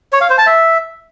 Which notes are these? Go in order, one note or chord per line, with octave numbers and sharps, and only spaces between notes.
C#5
F5
C5
A5
E5